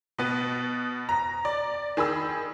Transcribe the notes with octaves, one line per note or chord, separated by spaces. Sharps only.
B2 B3
A#5 A#6
D5
D#3 G#4 B5 E6